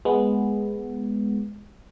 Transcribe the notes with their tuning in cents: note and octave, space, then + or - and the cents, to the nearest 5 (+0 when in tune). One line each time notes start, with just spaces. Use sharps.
G#3 +0 B3 +0